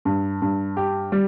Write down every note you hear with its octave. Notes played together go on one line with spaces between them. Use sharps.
G2
G2
G4
G3